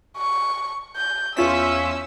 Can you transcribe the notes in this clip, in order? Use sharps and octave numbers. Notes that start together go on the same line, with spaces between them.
C#6
G6
E2 C#4 F4 E5 E6 B6